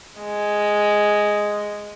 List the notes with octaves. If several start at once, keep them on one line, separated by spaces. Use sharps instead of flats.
G#3